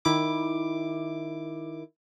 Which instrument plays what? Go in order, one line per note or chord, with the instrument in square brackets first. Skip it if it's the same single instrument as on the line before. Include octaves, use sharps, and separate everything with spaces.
[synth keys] D#3 E4 D6